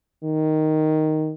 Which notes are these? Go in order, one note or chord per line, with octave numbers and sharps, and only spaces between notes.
D#3